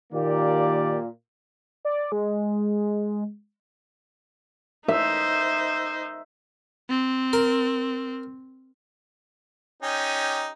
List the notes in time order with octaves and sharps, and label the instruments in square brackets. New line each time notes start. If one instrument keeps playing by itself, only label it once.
[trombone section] A#2 A#3 [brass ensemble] D#3 G4 D5
[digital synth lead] D5
G#3
[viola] D#4 C5 [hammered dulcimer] E5
[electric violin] C4
[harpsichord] A#4
[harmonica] C#4 D#4 G4